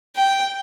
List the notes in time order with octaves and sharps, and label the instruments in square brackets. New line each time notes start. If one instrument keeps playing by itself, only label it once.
[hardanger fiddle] G5